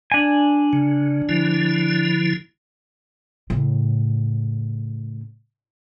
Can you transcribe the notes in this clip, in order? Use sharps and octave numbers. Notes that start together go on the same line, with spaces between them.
D4 G#5
C#3
D3 F3 E4
A2 C#3